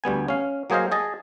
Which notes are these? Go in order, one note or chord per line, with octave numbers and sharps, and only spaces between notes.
D2 G3 B3 G#5
C#4 F5
F#3 A#3 G#4 C5 D#5 F5
G#4 D#5 A5